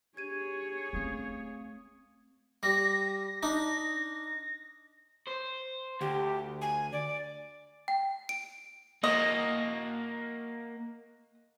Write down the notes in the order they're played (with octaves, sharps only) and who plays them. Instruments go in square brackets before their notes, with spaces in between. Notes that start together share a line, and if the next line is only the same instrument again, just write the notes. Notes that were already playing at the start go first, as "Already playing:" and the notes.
[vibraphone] D4 G4 [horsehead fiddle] G#4 C#5 [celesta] G#6 D#7
[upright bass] A3 C#4 [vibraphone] C4 F5 D#6
[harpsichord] G3 [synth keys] A#6
[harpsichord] D4 D#4
[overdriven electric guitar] C5
[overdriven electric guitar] D2 [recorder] G4
[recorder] G#5
D5
[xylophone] G5
D7
[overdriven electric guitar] A#3 F#4 [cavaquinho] D#5